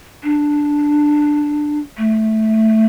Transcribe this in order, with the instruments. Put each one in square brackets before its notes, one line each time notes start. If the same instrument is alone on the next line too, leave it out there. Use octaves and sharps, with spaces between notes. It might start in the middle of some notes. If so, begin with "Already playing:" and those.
[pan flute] D4
A3